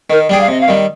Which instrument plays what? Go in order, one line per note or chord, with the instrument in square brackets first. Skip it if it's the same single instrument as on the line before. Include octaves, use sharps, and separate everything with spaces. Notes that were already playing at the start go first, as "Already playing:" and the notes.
[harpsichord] D#3 [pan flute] A#4
[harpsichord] G3 D4 G#4 [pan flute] G5
[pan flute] F5
[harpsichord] C3 [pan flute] D#5
[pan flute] F5
[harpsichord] D#3 G3